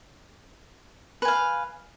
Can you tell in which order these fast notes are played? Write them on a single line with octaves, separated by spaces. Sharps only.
B4 G#5 F5